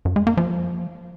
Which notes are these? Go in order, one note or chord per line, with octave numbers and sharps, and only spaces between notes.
F#2
G#3
A#3
F3